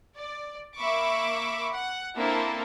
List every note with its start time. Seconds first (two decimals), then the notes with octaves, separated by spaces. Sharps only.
0.15 D5
0.76 A#3 E5 B5 C#6 D6
1.74 F#5
2.16 A#3 C4 D4 E4 A4 A#4